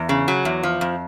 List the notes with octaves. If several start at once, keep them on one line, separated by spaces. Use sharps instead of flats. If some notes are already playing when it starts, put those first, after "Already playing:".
Already playing: E2
C#3
F#3
E2
F3
F2